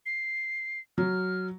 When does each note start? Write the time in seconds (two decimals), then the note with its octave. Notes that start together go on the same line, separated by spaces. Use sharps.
0.06 C7
0.98 F#3 F6